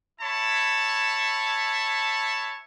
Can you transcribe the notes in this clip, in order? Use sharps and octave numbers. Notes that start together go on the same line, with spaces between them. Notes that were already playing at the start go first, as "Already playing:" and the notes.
E4 C#5 A5 B5